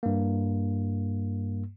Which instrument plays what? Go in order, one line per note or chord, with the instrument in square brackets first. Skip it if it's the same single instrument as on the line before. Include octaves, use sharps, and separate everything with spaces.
[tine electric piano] G2 A#3